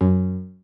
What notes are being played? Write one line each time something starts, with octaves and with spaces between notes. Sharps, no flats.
F#2